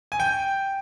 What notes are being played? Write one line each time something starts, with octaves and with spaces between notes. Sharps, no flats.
G#5
G5